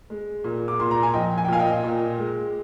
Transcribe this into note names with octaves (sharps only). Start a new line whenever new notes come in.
G#3
A#2
D6
A#2 C6
A#5
G#5
F3 D#5 G5
G#5
G5
A#2 F5 G#5
D#5 G5
A#2
G#3